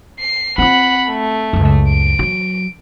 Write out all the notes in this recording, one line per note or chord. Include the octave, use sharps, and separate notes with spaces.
C7
C4 F4 F#5 B5
A3
C#2 F#2
D7
E3 F#3